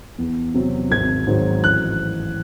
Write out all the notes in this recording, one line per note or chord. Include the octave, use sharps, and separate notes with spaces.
E2
C3 F#3
G#1 G#6
G#2 D#3 F#3
A1 F#6